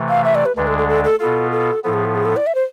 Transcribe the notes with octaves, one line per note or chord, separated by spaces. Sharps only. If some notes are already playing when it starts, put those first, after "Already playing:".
Already playing: C3 E3 A3
F5
E5
D5
B4
D2 D3 G#3 D4 B4
A4
A4
A4
A4
B2 B3 F4 A4
A4
A2 F3 B3 A4
G#4
A4
G#4
A4
D5
E5
C5